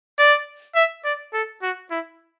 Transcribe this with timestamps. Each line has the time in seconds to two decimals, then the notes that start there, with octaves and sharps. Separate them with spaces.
0.19 D5
0.76 E5
1.05 D5
1.34 A4
1.62 F#4
1.91 E4